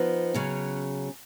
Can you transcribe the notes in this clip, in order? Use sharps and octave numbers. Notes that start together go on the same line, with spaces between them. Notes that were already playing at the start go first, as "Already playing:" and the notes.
Already playing: F3 B3 D#4
C#3 F#3 C#4